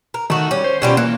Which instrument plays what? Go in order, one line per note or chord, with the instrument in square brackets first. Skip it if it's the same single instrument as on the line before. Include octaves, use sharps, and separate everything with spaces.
[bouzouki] A#4
[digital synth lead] D#3 [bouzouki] A3 F#4
[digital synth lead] G3 [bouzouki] C#4
[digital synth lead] C5
[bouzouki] B2 G3 F4 [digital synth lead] C#4
[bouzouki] E3 [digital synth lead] A#3